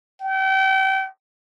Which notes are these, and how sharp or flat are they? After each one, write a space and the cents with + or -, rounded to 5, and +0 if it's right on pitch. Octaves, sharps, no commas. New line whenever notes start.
G5 -35